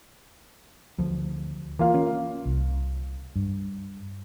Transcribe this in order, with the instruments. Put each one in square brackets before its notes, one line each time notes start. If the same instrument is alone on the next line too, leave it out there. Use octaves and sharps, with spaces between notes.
[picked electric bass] D2 F3
[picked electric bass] E3 [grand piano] A#3 F4 F5
[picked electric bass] C#4
[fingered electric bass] C2
G2